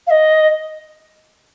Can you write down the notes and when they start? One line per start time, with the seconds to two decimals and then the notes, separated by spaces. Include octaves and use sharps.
0.07 F5
0.10 D#5